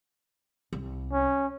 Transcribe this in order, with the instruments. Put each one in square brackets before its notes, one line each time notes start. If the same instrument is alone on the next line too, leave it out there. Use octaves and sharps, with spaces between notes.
[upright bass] C2
[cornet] C#4